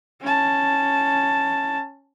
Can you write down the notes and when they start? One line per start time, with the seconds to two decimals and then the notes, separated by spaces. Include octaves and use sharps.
0.22 C#4 A5